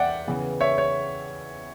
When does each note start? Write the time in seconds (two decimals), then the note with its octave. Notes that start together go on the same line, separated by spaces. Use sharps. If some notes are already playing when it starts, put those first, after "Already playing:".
Already playing: E2 D5 E5 F#5 G5
0.27 C#3 E3 B3
0.61 C#5 E5
0.78 C#5